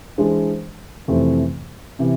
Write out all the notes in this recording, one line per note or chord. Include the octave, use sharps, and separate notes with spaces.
E3 G#3 D4 G#4 C5
F2 C3 E3 A3 C4
C3 E3